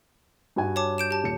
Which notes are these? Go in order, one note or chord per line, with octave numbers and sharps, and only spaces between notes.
G2 F#4 G#5
C#5 A5 D6
G6 D7 E7
G4 A5
D#1 C#7